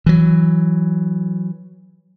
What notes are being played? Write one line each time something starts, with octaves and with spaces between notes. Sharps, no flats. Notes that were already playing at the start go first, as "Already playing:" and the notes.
E3 F#3